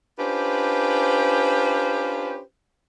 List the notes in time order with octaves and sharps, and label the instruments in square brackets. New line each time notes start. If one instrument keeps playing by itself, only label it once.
[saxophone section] C#4 D4 F4 G4 B4 C5